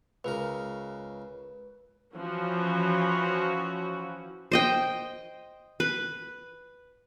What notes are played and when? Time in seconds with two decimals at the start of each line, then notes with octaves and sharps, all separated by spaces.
0.24 C#2 C#3 A#4 B4
2.14 E3 F3 C#4 F#4
4.52 C5 D#5 G5
5.80 B4